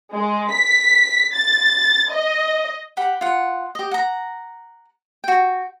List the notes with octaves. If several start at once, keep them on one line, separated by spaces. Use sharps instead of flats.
G#3
B6
A6
D#5
G4 F#5 B5
F4 F#5
G4 D#5
F#5 A#5
F#4 G5